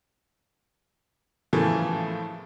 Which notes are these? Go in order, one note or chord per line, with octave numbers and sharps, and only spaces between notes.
A2 C#3 E3 F3 A3 A#3